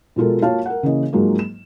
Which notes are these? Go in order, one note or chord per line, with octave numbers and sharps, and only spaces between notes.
B2 F3 G#3 F4 A4 A#4
A#3 F4 F#4 C#5 F5 A5
A#4 F#5
C#3 E3 A#3 C#4 D#5
G#2 F3 F#3 G#3 A#3
E7